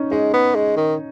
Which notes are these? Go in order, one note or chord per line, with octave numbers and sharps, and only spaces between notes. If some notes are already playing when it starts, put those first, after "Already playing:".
Already playing: C#4 D#4
G#3 D#4
B3
G#3
D#3